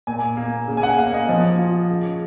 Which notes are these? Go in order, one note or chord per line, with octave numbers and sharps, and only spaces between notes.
A#2 G#5
A#3
C#3
G#5
F#5
A#3 F5
D#5
F3
F4
C#3